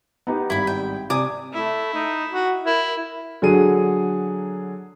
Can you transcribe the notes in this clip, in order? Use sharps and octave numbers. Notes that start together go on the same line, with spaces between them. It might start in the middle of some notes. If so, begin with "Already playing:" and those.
B3 D#4 G4
G#1 G3 E4 B5
G5
C3 D5 G#5 D#6
A3 E4
D#4
F#4
E4 A#4
D3 F#3 G#4 D#7